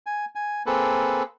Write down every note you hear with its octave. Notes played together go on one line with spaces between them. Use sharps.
G#5
G#5
A#3 C4 G#4 A4 B4